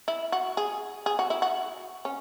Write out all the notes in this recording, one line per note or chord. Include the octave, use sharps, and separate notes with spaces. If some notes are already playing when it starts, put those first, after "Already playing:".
E4
F#4
G#4
G#4
F#4
E4
F#4
C#4